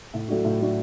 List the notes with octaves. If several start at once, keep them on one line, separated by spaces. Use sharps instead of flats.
A2
F#3 A3 D4 F#4
A2
F#3 A3 D4 F#4